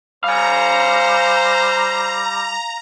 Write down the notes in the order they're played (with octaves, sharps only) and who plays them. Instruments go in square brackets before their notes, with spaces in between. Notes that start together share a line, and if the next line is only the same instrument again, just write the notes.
[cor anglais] G3 [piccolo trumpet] C5 [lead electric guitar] F5 G#5 [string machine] A#5